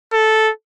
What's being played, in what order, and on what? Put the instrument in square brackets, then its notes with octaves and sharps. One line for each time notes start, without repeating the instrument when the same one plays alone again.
[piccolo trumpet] A4